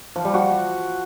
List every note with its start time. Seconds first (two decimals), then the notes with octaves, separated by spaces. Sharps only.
0.16 F3
0.25 G3
0.34 F#4